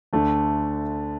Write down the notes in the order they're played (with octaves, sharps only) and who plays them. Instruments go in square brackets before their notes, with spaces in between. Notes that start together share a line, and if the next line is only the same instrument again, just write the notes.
[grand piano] D2 D3 A3 D4